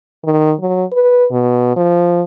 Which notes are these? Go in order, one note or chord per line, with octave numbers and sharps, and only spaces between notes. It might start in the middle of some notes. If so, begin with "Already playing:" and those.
D#3
F#3
B4
B2
F3